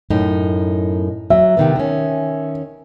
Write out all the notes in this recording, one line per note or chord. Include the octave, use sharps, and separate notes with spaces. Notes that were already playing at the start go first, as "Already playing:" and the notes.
F#2 A2 D#4
F#3 E5
C3 D#3 B3
D#3 C#4